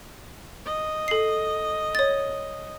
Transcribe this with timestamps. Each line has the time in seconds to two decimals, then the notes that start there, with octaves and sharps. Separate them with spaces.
0.65 D#5
1.08 A4 C7
1.95 C#5 A6